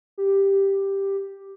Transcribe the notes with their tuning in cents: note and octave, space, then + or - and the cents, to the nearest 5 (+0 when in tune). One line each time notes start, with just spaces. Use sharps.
G4 +0